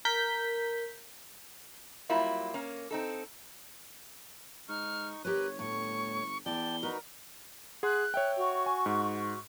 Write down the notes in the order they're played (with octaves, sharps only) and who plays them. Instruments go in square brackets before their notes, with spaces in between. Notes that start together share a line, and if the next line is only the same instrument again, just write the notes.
[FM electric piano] A#4 G6 B6
[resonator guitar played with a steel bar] F#3 G3 A#3 E4 F4
A#3 C#4
C4 D#4 A4
[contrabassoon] G#2 [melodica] D#4 C#6 [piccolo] F6
[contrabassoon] G1 [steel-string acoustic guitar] G4 A#4 B4 [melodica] C#5 [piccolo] F#6
[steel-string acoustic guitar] A2 [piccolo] C#6
[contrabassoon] E2 [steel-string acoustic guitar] D5 [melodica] G5 A5 [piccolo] G7
[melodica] D#4 F#4 B4 [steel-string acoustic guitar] A#4
[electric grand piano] G#4 F#5 C6 [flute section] F#6
[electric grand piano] C#5 E5 G5
[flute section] F#4 C#6
[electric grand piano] G#5
G#2